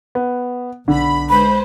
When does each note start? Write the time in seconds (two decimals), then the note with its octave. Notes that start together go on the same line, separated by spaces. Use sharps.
0.15 B3
0.88 B1 D3 B5
1.30 G#3 B4 C5 B5